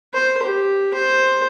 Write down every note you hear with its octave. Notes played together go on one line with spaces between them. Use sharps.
C5
G4
C5